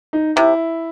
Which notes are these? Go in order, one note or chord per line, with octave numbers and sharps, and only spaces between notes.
D#4
C3 E4